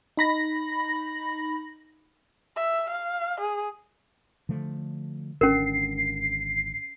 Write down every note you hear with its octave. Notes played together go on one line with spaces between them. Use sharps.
D#4 B5 A#6
E5
F5
G#4
D3 F3 A3
G#1 D3 C#4 A#4 C7